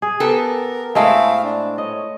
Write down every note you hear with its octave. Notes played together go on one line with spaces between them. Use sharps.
G#4
B3 G4 A4 A#4
A2 G#3 A3 C4 E4 F5
D4
C#5 D#5